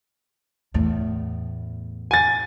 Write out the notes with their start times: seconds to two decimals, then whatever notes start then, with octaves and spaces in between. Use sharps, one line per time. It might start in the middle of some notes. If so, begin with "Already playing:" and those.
0.74 E2 A2
2.11 G#5 A6